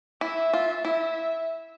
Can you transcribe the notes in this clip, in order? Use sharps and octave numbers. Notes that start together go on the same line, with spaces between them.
E4 E5
F4
E4 E5